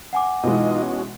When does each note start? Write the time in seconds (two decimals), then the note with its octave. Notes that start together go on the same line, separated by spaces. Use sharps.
0.13 F#5 G#5 D6
0.43 B2 E3 G#3 D#4 F4 D#5
0.82 C#4 F#4